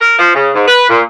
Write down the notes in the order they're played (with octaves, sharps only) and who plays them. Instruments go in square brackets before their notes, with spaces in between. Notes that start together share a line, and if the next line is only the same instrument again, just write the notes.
[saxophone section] A#4
F3
C#3
G#2
B4
A#2